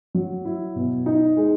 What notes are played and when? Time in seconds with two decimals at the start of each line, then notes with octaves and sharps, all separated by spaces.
0.15 F#3
0.45 E4
0.76 B2
1.06 D#4
1.37 G#3